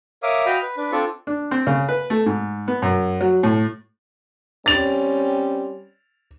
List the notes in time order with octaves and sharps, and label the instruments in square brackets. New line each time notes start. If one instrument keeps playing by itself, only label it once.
[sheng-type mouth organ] A#4 C#5 E5 F5 D6 D#6
F#4 D#5 F5 G5 B5 F6
B4
D4 B4
C4 D4 F4 A4 D5 C#6
[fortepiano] D4
C4
C#3
B4
A3
G#2
B3
F#2
F#3
A2
[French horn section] G3 C4 C#4 [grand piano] A6 F7